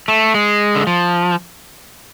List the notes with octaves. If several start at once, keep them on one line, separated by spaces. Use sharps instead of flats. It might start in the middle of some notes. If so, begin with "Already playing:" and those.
A3
G#3
D3
F3